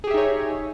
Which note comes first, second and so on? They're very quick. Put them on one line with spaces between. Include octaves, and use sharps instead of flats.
G#4 G4 E5 D#4 C#5